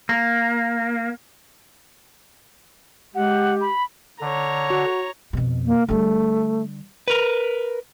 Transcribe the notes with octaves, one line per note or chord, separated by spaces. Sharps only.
A#3
G#3 G4 F#5
B5
D3 C#5 A#5
F#4
F2 B2
A#3
D3 G3 A3
A#4 B4